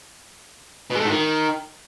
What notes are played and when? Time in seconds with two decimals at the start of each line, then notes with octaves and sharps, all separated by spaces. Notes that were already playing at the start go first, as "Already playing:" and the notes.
0.90 B2
0.95 G#3
1.00 A3
1.05 G#2
1.10 D#3